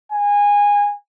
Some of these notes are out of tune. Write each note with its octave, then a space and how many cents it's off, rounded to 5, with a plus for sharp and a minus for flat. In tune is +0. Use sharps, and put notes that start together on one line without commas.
G#5 -20